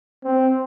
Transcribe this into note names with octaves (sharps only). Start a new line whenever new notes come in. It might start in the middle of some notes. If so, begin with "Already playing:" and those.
C4